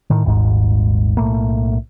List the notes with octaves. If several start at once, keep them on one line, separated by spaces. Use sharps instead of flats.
A2 D#3
D#1 G#1 G#2
B1 A2 A3 A#3